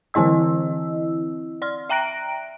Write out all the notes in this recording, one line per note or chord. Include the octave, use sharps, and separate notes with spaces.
D3 E3 C4 E4 D#5 E6
D5 C6 F6
E5 G5 A#5 F#6 A#6 D7